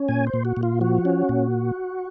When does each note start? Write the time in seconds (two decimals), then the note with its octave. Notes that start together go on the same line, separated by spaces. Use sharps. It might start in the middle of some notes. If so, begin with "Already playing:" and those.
Already playing: C#4
0.08 A#2 G#5
0.27 C5
0.33 A#2
0.45 F#4
0.57 A#2
0.63 F4
0.81 F3 F#4
1.05 C#4
1.29 A#2